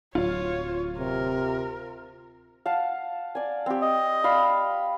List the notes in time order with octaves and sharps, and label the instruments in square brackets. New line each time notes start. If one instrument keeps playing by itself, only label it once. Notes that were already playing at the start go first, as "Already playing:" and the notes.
[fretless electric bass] D1 F#3 [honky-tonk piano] F4 [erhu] C#5
[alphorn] C3 [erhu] A#4
[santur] F5 F#5 A5
D5 G#5
C4 G4
[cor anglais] D#5
[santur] D5 F5 B5